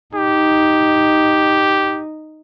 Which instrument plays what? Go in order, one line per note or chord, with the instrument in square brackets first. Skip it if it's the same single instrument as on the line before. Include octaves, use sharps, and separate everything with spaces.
[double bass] D#4 [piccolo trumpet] G4